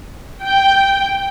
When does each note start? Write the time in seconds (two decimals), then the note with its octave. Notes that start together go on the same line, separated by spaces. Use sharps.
0.43 G5